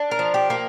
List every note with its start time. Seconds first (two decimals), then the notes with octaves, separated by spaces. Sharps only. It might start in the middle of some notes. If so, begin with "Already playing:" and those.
Already playing: D4
0.11 A#4
0.19 F3
0.34 G4
0.50 A#3